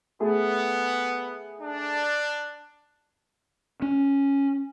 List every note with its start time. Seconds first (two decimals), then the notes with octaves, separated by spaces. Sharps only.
0.20 A3 B3 G#4
1.61 D4
3.82 C#4